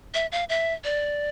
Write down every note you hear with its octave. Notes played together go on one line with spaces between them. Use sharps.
E5
F5
E5
D5